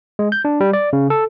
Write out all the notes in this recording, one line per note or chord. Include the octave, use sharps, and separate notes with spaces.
G#3
G6
D4
G3
D5
C#3
A4